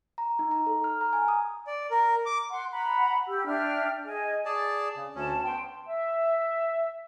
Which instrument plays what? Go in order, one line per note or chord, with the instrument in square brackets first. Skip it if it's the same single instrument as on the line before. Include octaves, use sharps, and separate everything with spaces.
[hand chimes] A#5
D#4
A#5
A4
F6
A#5
G#5
D#6
[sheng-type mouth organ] D5
A#4
D6
[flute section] F#5 C6
F#5 A#5 B5
G4 E6
D4 E5 G5 F6
G#4 D#5 G#5
[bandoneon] G#4 D5 A5
C#3
[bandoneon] D2 C#4 [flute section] A5
[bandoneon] B3 [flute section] G5 C6
[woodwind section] E5